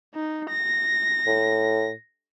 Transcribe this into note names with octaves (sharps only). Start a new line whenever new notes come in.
D#4
A#6
A2